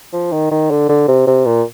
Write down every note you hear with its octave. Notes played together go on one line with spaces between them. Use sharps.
F3
D#3
D#3
D3
D3
C3
C3
A#2